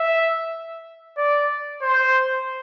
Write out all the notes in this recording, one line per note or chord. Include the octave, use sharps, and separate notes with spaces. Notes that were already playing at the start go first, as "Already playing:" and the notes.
Already playing: E5
D5
C5